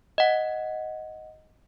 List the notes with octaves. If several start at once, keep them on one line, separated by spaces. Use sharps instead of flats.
D#5 F#5